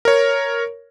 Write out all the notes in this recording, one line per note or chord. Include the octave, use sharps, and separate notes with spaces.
A#4 C#5